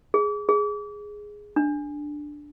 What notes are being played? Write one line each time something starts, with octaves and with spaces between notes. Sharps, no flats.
G#4
G#4
D4